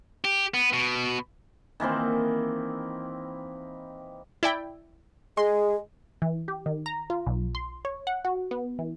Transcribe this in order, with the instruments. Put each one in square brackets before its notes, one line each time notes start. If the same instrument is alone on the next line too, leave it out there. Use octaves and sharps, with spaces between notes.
[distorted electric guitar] G4
B3
B2
[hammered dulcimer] D#3 E3 A#3 C4
[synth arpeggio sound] E4 D5 G5
[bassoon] G#3 [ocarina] G#4 [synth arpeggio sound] C6
[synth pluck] E3
G4
D#3
A#5
F4
B1
C6
C#5
F#5
F#4
B3
E3